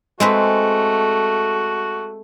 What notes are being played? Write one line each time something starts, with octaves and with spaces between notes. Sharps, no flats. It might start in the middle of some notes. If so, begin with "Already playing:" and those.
G#3 A3 C4 F#4 B4